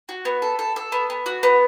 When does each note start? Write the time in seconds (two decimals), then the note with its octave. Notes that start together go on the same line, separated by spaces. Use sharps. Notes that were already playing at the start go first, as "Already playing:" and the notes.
0.09 F#4
0.25 B3
0.42 A4
0.59 A4
0.76 A4
0.92 B3
1.10 B3
1.26 F#4
1.43 B3